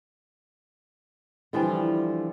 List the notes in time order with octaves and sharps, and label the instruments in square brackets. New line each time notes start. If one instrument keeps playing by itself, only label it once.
[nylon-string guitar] D3 E3 F3 G3